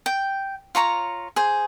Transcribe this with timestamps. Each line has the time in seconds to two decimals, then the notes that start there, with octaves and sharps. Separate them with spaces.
0.06 G5
0.75 F4 C#5 A#5 C#6
1.36 G#4 C5